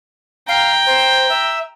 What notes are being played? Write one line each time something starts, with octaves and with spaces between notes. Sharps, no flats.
F5 G5 A#5
C5
E5